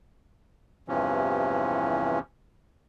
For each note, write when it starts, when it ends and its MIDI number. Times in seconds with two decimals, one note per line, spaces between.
0.88 2.19 40
0.88 2.19 43
0.88 2.19 48
0.88 2.19 52
0.88 2.19 53
0.88 2.19 61